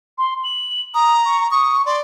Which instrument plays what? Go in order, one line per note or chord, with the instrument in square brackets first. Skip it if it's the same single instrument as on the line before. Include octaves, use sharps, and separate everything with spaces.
[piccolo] C6
F#7
[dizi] A#5 [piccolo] D#6
[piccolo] C#6
[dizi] C#6 [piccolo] D#6
[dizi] D5 [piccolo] C6